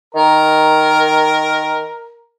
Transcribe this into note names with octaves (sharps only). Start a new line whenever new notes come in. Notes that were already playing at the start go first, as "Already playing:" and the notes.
D#3 A#4